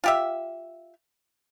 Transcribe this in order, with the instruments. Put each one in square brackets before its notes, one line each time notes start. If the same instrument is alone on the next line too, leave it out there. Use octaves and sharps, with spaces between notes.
[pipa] F4 G4 E5